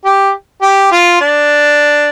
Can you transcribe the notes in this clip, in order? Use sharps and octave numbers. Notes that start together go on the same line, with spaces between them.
G4
G4
F4
D4